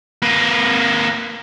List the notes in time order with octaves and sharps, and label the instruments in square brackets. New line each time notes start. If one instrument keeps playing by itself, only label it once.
[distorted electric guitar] A#3 B4